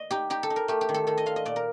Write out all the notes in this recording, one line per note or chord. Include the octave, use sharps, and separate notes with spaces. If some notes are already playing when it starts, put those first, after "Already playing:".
Already playing: D#5
D#4 G4
D#4 G4
A4
D#4
A#4
A3 G4
G4
D#3
A4
D#3 A4
D#5
F4 F5
D#5
A#2 D5
A#4